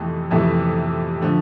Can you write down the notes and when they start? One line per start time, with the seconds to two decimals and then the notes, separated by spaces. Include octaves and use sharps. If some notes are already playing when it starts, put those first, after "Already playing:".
Already playing: F2 C3 E3 A3
0.31 F2 C3 E3 A3 E5
1.21 D3 F3 A3